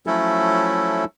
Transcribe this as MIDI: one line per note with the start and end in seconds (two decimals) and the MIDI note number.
0.07 1.05 53
0.07 1.05 54
0.07 1.05 57
0.07 1.05 61
0.07 1.05 64
0.07 1.05 69